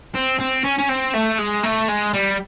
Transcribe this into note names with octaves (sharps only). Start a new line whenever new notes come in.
C4
C4
C#4
C#4
C4
A3
G#3
A3
G#3
G3